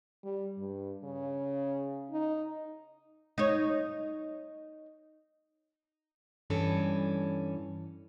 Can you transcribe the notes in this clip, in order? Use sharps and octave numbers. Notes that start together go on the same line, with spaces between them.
G3
G2
C#3
D#4
D#4 C#5
G2 E3 C#4 A4